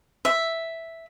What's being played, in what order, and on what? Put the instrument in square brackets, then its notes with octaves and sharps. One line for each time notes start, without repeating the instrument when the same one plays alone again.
[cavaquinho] E5